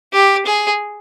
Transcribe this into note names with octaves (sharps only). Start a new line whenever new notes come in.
G4
G#4